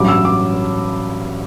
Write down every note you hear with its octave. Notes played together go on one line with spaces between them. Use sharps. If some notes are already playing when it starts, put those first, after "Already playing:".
Already playing: A1 G2 F#3 D6
E6
D6